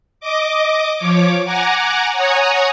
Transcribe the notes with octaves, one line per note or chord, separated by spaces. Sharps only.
D#5 D6
F3 C#5 D6
F#5 G#5 A#5 D6
C#5 F#5 G#5 A#5 D#6